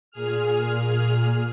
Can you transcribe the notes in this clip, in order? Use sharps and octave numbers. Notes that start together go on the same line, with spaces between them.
A#2 G#4 F6